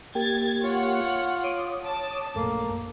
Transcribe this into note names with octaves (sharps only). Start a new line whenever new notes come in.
A#3 G4 G#6 A6
F4 C#5 F#5
C#5 D6 D#6
A5
A#1 F#2 A3 A#3